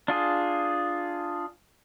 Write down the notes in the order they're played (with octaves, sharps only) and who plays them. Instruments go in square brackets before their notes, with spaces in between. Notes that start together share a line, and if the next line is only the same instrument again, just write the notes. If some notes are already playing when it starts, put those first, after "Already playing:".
[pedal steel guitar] D4 F4 G#4